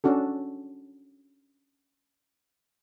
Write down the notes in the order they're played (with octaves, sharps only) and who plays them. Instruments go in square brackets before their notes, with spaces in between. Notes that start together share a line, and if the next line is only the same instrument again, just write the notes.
[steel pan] C#4 D4 F#4 A4